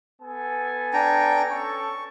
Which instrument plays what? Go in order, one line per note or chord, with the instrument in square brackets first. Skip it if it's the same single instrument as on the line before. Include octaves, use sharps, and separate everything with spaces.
[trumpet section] B3 A4 G#5
[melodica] D4 G5 A#5
[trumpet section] C#4 A4 [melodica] C#6